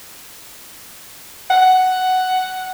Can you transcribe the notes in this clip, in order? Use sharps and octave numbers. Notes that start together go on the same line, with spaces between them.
F#5